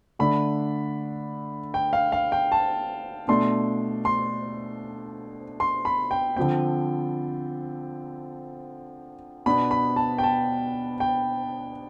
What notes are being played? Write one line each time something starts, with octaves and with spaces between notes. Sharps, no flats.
D3 A3 D4 B5
G5
F5
F5
G5
A5
B2 A3 D4 C6
C6
C6
B5
G5
D3 F3 C4 G5
B2 B3 D4 B5
B5
A5
G5
A5
G5